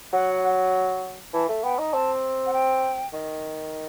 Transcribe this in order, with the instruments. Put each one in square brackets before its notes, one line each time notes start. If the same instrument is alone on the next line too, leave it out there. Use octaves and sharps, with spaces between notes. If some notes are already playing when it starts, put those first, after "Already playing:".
[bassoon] F#3 [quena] F#5
[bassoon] E3 [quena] A5
[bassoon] A3
[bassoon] B3 [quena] G5
[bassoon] D#4
[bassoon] C4 [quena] A5
[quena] F#5
G5
[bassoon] D#3